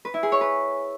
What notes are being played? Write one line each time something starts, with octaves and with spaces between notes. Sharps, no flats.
B4
E4
G#4
C#5
B4